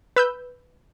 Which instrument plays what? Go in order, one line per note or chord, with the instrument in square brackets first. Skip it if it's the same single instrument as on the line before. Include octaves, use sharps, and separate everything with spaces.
[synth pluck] B4 E6 G6